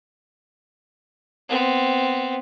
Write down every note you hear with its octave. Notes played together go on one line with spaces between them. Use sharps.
B3 C4